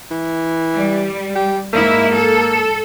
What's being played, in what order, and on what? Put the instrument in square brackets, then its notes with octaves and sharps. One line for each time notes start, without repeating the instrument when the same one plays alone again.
[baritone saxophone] E3
[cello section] G3
[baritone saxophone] G4
[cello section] G#2 E4 [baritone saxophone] A#3
[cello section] A4